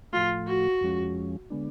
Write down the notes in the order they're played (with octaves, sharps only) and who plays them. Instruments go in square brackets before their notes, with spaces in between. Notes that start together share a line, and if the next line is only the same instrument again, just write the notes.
[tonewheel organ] A2 F3 A3 [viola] F4
[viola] F#4
[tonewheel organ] F2 F3 G#3 C#4
D3 G#3 B3 D4